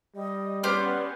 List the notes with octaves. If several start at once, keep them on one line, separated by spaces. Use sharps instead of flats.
G3 D#5
B3 C#4 G4 C5 D5 F6